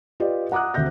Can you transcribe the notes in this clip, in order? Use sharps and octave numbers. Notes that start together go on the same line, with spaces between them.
F4 G4 B4 D5 D#5
F#5 A#5 D6 D#6 F#6
D2 C4 E5 G6 A#6